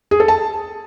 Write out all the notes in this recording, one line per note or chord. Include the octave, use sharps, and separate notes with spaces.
G#4
A4
A5